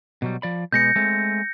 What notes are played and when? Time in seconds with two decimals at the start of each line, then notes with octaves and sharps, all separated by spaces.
0.22 B2 F#3 G3
0.42 F3 D5 B5
0.72 B2 G#3 B3 G6 A#6 C#7
0.96 G#3 A3 C4